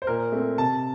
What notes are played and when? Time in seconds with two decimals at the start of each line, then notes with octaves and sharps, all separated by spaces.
0.02 C5
0.07 A#2 A#4
0.32 A3 C4
0.58 C3 A5